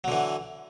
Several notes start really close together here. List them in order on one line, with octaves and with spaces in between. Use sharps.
F#3 D3 E3